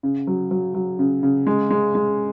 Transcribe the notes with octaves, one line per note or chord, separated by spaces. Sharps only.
C#3
F#3
F#3
F#3
C#3
C#3
G#3
G#3
G#3